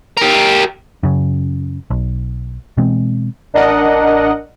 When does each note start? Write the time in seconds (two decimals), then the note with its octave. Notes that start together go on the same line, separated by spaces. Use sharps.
0.17 G4 A#4
1.03 F#2 C#3
1.90 B1
2.77 B2 E3 G#3 C4
3.53 A1 D4 A#4 D#5 F#5